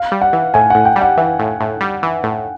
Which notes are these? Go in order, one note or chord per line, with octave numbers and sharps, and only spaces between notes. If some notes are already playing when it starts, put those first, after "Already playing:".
Already playing: F5
G3
F#5
E3
A2 G#5
A2 F#5
G5
G3
F#5
E3
A2
A2
G3
E3
A2